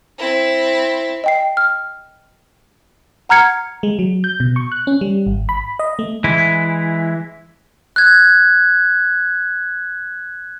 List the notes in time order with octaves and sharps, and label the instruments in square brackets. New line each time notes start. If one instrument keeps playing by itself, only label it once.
[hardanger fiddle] C4 E4
[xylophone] D#5 G5 C7
F6
F#5 A#5 F6 G#6 C#7
[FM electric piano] G#3
F#3
G6
B2
C#6
F#6
C#4
G3
G#1
B5
D#5
A3
[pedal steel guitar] E3 G#3 E4
[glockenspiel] F#6 G#6